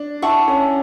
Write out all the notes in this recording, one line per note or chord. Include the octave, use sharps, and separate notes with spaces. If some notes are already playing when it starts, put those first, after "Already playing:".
Already playing: D4
E4 D5 F#5 A5 C#6
C#4